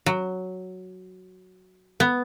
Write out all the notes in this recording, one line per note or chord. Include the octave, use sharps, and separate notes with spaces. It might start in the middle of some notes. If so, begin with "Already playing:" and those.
F#3
B3